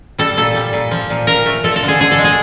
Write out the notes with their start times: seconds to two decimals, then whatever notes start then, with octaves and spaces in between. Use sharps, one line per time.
0.18 G3 A4
0.37 A#2 A4
0.55 G3
0.73 A#2
0.91 F3
1.10 A#2
1.27 A#2 A#4
1.46 A3
1.64 F3 A4
1.76 A4
1.83 D3
1.88 G#4
2.00 D3 G#4
2.12 A4
2.18 G#3
2.24 G#4